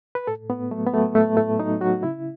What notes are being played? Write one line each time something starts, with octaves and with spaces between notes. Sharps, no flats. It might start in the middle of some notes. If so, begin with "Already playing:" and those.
B4
A2 A4
A2 B3
F#3 A3
B3
F#3 A3
A2 A3
A2 A3
F#3 D#4
F#3 F#4
C#3 E4